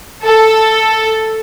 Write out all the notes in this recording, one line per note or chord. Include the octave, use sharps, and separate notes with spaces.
A4